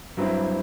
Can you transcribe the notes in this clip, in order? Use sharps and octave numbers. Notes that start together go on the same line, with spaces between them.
G2 F#3 C4 E4